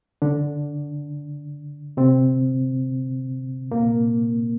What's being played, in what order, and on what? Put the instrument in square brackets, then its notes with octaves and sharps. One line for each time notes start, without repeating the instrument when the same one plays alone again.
[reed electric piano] D3 D4
C3 C4
A#2 A#3